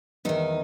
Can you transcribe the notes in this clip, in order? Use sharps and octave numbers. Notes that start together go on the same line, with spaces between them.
E2 D#3 D#4